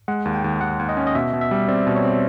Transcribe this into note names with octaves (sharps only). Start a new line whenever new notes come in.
G#3 F#5
D#2
G5
D#2
D#2 F#5
D#2
D#5
C#4
D#5
B2 E5
B2
E5
G3
C4 D5
B2
C#5
C4